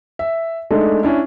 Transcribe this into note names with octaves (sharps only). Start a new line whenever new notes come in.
E5
G#3 A3 D4 D#4 A4
C#4 D4 E4